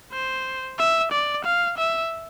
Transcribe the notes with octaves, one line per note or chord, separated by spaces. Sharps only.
C5
E5
D5
F5
E5